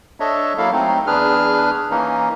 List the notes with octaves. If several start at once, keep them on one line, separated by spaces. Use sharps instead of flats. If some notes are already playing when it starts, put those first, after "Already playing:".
D4 A4 C#5 D#5 E5
F#3 A#3 E4 A4 F5
F#3 A3 C4 D#4
E2 D4 G#4 B4 F6
E3 A#3 C#4 D#4